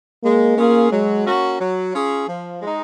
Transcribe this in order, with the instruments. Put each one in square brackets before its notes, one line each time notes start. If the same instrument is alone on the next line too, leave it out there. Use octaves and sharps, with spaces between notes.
[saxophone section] G#3 [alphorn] A#3
[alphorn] A#3 [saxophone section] C#4 F4 G#4
[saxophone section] F#3 [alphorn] G#3
[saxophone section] A#3 C#4 F#4
F#3
C#4 F4 G#4
F3
G#3 D#4